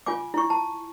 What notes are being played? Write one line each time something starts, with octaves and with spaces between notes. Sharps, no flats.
F4 G#5 D6
E4 C#6
A5